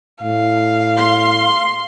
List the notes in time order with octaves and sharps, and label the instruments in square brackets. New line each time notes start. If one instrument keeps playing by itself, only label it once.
[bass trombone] A2 [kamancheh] F5
[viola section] C6